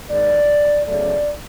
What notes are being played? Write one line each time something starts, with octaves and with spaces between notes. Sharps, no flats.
G#2 D#3 G#3 D5
E2 C#3 F#3 A3 D5